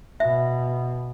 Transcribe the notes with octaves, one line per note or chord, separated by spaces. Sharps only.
B2 E5